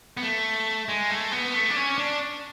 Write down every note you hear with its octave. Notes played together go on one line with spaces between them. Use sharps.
B3
A3
G#3
A3
B3
A3
D4
C#4
D4